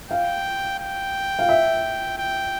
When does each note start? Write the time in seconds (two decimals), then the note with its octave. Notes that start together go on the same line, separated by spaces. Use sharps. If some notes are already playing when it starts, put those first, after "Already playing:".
0.11 F5 G5
0.79 G5
1.39 F5
1.49 E5
2.18 G5